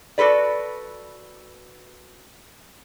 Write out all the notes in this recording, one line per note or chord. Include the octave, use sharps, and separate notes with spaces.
F#4 G#4 A4 B4 D5